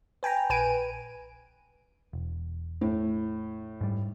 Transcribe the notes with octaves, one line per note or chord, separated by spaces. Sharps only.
B4 G5 G#5 A#5
A#1 B4 G#5 D7 D#7
E1
A2
G#2 G3